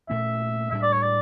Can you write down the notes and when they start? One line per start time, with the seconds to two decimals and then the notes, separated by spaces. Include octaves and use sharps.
0.10 A#2 A3 C#4 E5
0.71 A2 G3 D4 E5
0.83 D5
0.93 C#5
1.02 D5